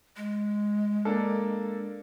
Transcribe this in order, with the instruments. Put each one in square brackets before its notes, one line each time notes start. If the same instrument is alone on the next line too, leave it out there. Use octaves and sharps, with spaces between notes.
[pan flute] G#3
[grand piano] A#3 D4 A4